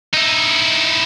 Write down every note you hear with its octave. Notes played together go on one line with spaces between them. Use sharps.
D#4 E4